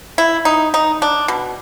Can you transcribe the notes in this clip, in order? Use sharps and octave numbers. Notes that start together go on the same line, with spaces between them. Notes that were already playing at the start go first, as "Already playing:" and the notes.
E4
D#4
D#4
D4
B2